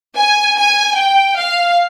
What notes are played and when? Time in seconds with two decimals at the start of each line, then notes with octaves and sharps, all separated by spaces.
0.16 G#5
0.56 G#5
0.95 G5
1.36 F5